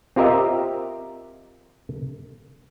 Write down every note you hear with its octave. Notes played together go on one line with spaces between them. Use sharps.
C4 F4 G4 A#4 D#5 E5